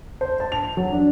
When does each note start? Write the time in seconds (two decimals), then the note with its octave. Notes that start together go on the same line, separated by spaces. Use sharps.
0.21 C5
0.40 A5
0.52 F7
0.77 F#3
0.92 D4